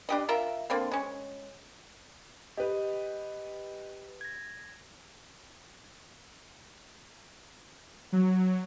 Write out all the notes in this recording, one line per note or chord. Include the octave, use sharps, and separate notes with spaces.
D4 G4 D#5
F4 A#4 E5
D3 A#3 C4
G#3 C#4
G4 B4 D#5
G#6 A#6
F#3